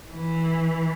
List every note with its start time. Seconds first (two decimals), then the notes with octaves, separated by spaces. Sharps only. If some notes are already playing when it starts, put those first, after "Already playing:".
0.10 E3